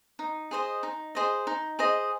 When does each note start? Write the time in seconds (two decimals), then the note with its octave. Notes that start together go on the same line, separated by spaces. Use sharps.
0.19 D#4
0.51 G#4 C5 D#5
0.83 D#4
1.15 G#4 C5 D#5
1.47 D#4
1.79 G#4 C5 D#5